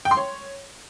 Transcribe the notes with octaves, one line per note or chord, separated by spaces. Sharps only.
G5
C6
C#5